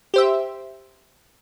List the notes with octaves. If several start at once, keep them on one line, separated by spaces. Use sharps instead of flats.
G4 C5 E5